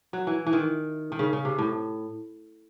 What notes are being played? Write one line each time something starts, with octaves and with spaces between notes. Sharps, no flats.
F#3
E3
E3
D#3
D#3
C#3
C#3
C3
A2